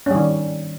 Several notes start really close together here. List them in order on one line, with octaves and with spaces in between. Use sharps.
C#4 G3 D#3